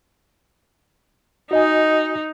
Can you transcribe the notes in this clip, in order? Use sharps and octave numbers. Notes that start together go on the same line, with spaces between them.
D#4 F#4 D#5 G#5